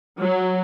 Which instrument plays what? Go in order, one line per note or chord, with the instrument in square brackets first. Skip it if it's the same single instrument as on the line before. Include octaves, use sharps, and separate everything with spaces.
[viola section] F#3